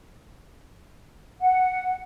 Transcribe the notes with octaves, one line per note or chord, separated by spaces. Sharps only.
F#5